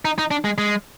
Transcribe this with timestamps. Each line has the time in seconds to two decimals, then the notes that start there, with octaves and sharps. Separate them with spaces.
0.05 D#4
0.19 D#4
0.31 D4
0.44 G#3
0.58 G#3